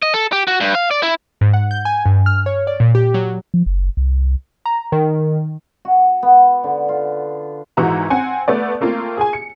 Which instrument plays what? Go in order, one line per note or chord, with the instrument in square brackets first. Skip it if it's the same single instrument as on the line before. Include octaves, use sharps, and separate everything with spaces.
[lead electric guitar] D#5
A4
G4
F#4
G2
F5
D5
E4
[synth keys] G#2
F#5
G6
G#5
G2
F6
C#5
D5
A#2
G4
F#3
[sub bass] F3
F#1
C2
[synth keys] A#5
D#3
[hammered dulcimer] F#4
B3
D3
F4
[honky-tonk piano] G#1 G#2 E3 E4 F#4 A#5
C4 F#5 G#5
A3 B3 D5
A3 A#3 C4 F4
G#4 G#5
C#7